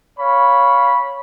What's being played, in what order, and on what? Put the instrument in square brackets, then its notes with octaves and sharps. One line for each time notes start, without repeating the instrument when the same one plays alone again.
[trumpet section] C#5 F5 B5